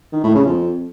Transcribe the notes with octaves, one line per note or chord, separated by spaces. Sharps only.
D#3
A2
C#3
F2